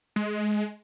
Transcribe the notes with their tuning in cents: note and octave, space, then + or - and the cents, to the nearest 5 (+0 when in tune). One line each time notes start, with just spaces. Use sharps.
G#3 +20